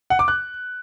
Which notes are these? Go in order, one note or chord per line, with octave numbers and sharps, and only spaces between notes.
F#5
D6
F#6